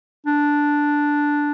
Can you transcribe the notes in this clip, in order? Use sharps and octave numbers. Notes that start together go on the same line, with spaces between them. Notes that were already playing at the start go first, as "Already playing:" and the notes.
D4